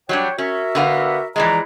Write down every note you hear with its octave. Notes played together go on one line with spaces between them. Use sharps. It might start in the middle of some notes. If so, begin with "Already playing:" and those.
F#3 G3 D4 C#5 G5
C#4 F#4 A#4 E5
D3 B3 F5
E3 F3 G#3 D5 A#5